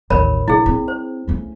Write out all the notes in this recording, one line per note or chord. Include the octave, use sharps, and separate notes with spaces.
A1 D#2 A#4 C#5 B5
A#1 E4 G#4
C4
C5
A3 C#4